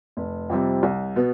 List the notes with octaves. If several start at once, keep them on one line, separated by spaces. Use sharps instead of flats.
F1
F2 C3 G3 C4
C2
B2 B3